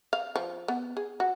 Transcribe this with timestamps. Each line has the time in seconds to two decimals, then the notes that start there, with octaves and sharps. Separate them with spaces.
0.13 F5
0.36 F3
0.68 B3
0.97 G#4
1.20 F#4